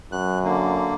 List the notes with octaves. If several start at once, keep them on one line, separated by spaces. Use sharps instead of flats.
F#2 F#6
D3 A#3